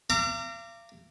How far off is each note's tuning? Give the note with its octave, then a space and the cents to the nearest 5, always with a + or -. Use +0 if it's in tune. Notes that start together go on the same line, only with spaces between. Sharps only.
F5 -40 A#5 -25 D6 +0